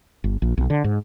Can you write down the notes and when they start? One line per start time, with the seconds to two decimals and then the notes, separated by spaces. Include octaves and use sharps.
0.24 G1
0.42 A#1
0.57 B1
0.70 D3
0.84 G#2